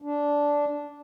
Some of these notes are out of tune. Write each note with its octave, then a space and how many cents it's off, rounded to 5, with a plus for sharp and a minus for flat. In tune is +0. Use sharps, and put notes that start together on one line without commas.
D4 -10